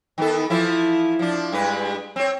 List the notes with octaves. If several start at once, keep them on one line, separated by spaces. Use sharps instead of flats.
D#3 B3 A4
E3 F3 E4
F3 D4
G2 G#3 B4
C4 C#5